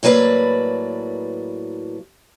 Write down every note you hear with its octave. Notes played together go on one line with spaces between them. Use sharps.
A2 F#3 A#3 B4 D5